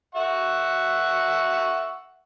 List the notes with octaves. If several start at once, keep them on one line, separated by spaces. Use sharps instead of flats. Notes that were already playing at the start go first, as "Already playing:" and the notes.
E5 F#5 C#6